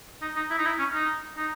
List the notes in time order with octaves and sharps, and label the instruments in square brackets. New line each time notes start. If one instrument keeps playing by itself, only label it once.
[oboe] D#4
D#4
E4
D#4
E4
C#4
D#4
D#4